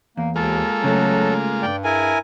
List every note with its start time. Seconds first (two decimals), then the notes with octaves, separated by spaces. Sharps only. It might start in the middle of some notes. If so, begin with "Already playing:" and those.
0.17 E2 A#3
0.36 D#2 G#3 A#3 F4 A4
0.84 C#3 F#3 A3
1.62 G2 D5 G5
1.84 E4 G#4 A#4 G#5